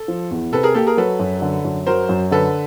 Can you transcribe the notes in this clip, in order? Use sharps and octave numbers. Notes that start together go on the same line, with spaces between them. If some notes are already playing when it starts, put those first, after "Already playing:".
Already playing: A4
F3
E2
C3 A4 B4
G#4 A#4
A#3 G4 A4
G#4 A#4
F#3 A4 B4
F#2
D3
F#2
F#3 A#4 C5
F#2
D3 A4 B4